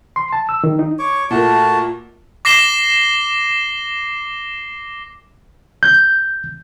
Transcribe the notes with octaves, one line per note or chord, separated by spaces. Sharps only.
C6
A5
E6
D#3
D#4
C#5 C#6 D6
A#2 A3 A#3 F#4 A5
D6 A#6 C7 E7 G7
G6